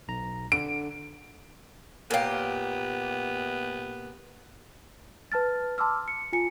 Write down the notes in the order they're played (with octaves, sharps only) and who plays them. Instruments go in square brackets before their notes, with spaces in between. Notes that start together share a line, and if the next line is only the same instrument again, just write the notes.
[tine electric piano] B1 A#5
[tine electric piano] D3 [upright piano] D7
[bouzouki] A#2 G4 [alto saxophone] B3 [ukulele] A#4 C#5 F5
[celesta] B4 A5 F6 A6
A5 C6 D6 E6 F6
C#7
F4 G#5 C#7